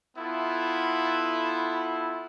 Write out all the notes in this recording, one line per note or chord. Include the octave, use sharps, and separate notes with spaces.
B3 E4 F4 A4